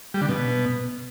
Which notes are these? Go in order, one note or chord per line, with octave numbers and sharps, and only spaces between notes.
G3
D3
B2